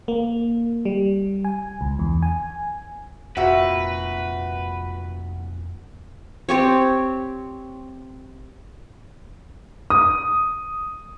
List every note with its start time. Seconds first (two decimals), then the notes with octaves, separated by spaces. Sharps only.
0.08 A#3
0.85 G3
1.45 G#5
1.81 C#2
1.99 E2
2.22 G#5
3.37 F1 A#2 F#4 B4 E5
6.49 C4 G4 C#5
9.90 D#6